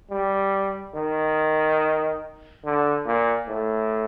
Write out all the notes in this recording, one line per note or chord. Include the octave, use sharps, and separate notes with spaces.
G3
D#3
D3
A#2
A2